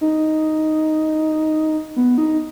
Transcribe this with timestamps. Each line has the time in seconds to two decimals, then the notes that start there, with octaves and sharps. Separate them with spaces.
0.01 D#4
1.96 B3
2.18 D#4